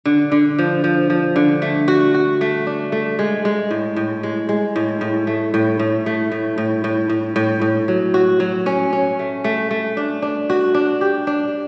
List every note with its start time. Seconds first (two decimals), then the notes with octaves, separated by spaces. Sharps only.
0.05 D3
0.32 D3
0.59 F3
0.84 F3
1.10 F3
1.36 D3
1.62 A3
1.88 F#4
2.14 F#4
2.41 A3
2.67 D4
2.92 A3
3.19 G#3
3.45 G#3
3.70 A2
3.96 A2
4.23 G#3
4.49 G#3
4.76 A2
5.01 A2
5.27 A3
5.54 A2
5.79 A2
6.06 A3
6.32 A2
6.58 A2
6.84 A2
7.09 A2
7.36 A2
7.62 A2
7.88 F#3
8.14 F#4
8.40 F#3
8.66 C#4
8.93 C#4
9.19 A3
9.44 A3
9.71 A3
9.97 D4
10.22 D4
10.50 F#4
10.74 D4
11.01 G4
11.27 D4